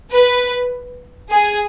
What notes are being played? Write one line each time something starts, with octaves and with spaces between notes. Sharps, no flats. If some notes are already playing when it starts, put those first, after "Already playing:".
B4
G#4